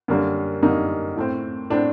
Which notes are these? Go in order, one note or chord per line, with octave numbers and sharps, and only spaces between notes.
F#2 D3 G3 A#3
F#2 D3 G3 A#3 D#4
A2 A3 C4
A2 A3 C4 D4